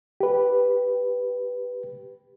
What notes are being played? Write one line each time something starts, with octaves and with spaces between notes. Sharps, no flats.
G4 B4